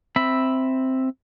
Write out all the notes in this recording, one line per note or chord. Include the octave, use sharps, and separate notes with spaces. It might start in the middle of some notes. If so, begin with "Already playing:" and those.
C4 E5 B5